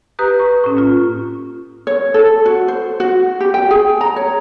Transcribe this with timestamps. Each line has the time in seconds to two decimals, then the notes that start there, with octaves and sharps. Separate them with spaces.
0.19 G4 B4 A#5 D#6 F#6
0.40 C#6
0.64 A2 C#4
0.75 A#3 C#4 F4
1.87 C#5
2.14 A4
2.46 F#4
2.68 C5
3.00 F#4
3.40 G4
3.54 G5
3.71 G#4
4.01 A#5
4.16 C#5